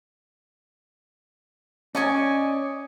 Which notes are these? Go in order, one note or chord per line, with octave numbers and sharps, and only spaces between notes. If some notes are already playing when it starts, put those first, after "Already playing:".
C#4 D5 D#5 G#5